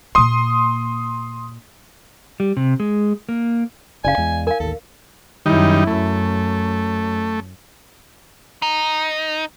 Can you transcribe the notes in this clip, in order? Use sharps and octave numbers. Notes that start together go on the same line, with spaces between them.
A#2 A#3 C6 D#6
G3
C3
G#3
A#3
F#1 C#3 D5 F5 G#5
E2 G#3
A#4 F5 G#5
A1 D#2 A4
F#2 D#3 G3 D#4 E4
F#2 A3
D#4